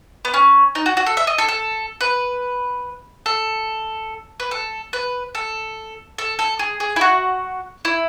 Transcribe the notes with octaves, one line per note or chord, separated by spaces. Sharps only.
B3
C#4
D#4
F#4
F#4
A4
E5
D#5
A4
A4
B4
A4
B4
A4
B4
A4
A4
A4
G#4
G#4
E4
F#4
E4